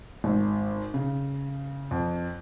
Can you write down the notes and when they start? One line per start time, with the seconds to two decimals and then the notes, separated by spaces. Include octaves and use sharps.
0.24 G#1
0.94 C#3
1.91 F2